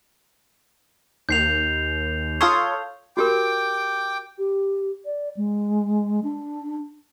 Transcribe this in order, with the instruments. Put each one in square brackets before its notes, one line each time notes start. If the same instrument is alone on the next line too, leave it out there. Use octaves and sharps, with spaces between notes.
[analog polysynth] D#2 [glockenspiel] G6 C7 F7
[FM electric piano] F4 A4 C#5 [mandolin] C6 D#6
[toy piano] F#4 G4 A#4 [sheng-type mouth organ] G5 D6
[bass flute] G4
D5
G#3
D4